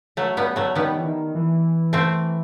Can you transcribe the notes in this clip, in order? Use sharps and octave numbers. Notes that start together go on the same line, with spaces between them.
F#3 A3
G3 B3
F#3 A3
D#3 G3 B3
E3
D#3
E3
A3 C4